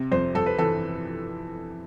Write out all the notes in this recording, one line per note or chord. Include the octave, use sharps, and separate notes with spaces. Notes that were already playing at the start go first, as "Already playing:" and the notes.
Already playing: C3
F2 C5
F2 A4
B4
E3 A4